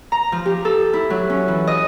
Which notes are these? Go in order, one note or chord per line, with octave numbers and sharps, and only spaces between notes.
A#5
F3
G4
A4
E4
F#3
C#4
E3
D#5